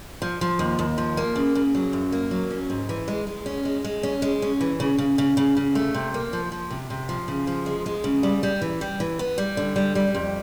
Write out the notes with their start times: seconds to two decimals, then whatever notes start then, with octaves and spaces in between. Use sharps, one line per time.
0.22 F3
0.41 F3
0.59 D#2
0.79 D#2
0.98 F3
1.17 A#3
1.36 C#3
1.55 C#3
1.75 F#3
1.93 F#2
2.12 A#3
2.31 F#3
2.51 C#4
2.70 G#2
2.89 E3
3.08 G#3
3.27 G#3
3.46 C#4
3.65 G#3
3.84 G#3
4.03 C#4
4.22 G#3
4.42 C#4
4.61 E3
4.80 C#3
4.98 C#3
5.18 C#3
5.37 C#3
5.57 C#3
5.75 A3
5.94 C3
6.14 A#3
6.33 F3
6.52 F3
6.71 C3
6.90 C3
7.09 F3
7.28 C#3
7.47 F3
7.66 G#3
7.86 G#3
8.04 C#3
8.23 G3
8.43 G3
8.62 E3
8.81 G3
9.00 E3
9.19 B3
9.38 G3
9.57 D3
9.76 G3
9.95 G3
10.15 F2